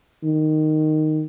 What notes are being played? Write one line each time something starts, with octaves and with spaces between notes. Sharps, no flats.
D#3